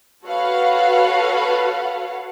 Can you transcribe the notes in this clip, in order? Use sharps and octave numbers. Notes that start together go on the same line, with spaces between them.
F#4 A4 B4 C#5 F5 F#5